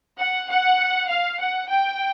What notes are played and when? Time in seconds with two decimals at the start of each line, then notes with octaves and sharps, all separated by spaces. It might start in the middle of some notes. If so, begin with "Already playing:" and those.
0.19 F#5
0.49 F#5
1.09 F5
1.40 F#5
1.69 G5